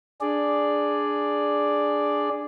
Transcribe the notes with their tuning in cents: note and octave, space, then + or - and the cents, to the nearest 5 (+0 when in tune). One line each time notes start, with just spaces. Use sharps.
D4 +0 G#4 +0 D5 +0